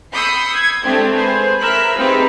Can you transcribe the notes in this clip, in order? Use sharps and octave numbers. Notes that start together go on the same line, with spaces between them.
B5 D#6 E6 G6 C7 C#7
G#6
G#3 A3 C4 D4 G4
G#4 B4 C5
A#4 E5 B5 E6 F#6
C4 D#4 F4 G4 G#4 B4